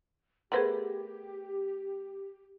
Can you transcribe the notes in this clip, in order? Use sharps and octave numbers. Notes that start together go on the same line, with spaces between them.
A3 B3 G4 G#4 A#4 C5 F#5